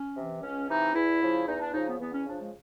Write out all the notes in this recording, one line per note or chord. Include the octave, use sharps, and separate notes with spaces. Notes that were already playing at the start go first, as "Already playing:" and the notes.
Already playing: C#4
C3 E3
C#2 C#4
C3 E3 D#4
E2 E4
C#3 F3
E2 D#4
D4
C#3 F3 D#4
B3
E2 B3
C#4
C#3 F3 D4
G#3